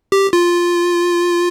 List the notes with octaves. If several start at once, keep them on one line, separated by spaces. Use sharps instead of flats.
G4
F4